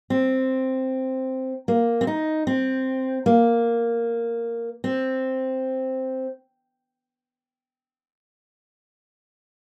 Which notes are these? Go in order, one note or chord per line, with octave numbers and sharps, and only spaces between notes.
C4
A#3
C4
D#4
C4
A#3
C4